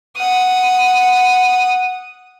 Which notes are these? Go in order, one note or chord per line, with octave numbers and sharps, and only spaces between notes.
F#5 D#6